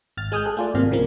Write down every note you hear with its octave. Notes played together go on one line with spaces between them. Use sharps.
G#1 F6 A6
G#3 G#5 D#6 F6 G6
G#4 A4 F#6
A3 F4 D5
G#1 A2 C3 A#3 F6
C2 C#3 F3 A#3